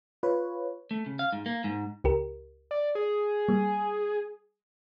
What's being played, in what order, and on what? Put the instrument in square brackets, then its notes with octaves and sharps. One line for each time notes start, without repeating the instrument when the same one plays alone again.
[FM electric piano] F4 B4 C#5
[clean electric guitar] A3
C#3
F5
G#2
A#3
G#2
[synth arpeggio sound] C#2 G4 A#4
[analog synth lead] D5
G#4
[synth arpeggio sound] G3 A#3